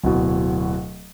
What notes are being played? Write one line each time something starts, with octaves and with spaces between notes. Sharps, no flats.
D1 B2